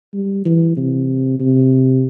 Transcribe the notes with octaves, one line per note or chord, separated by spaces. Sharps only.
G3
E3
C3
C3